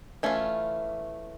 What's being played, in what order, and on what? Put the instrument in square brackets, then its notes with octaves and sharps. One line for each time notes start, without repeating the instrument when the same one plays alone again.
[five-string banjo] E3 A3 C#4 F4